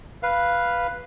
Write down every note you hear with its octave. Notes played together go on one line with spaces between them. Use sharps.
B4 F5